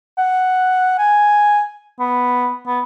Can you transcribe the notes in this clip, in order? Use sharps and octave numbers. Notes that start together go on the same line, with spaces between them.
F#5
G#5
B3
B3